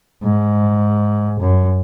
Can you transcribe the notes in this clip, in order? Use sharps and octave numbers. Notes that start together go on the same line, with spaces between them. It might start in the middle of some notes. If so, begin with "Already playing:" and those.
G#2
F#2